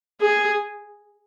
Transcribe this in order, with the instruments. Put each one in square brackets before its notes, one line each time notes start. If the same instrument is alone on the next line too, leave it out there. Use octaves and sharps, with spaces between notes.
[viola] G#4